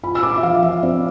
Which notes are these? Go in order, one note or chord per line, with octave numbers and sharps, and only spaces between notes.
F4 B5
E6
F4 D6
E5
F3 F5
F3 E5
C4 D5